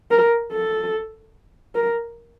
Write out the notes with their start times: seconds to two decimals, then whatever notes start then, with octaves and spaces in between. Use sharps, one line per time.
0.11 A#4
0.52 A4
1.75 A#4